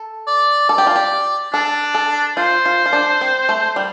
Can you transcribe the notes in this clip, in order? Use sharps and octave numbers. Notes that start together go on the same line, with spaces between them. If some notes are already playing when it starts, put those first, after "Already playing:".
Already playing: A4
D5
A4 D5
G4
F4
G4
D4 A4
A4
F4 C5
F4
F4
D4
C4
A3
G3